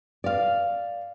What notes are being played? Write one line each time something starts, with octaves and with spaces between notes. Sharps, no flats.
D5 F5